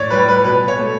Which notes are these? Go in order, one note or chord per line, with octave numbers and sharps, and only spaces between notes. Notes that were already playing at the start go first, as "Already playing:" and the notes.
Already playing: A2 C#5 D5
G3 B4
B4
B2 B4
C#5
A3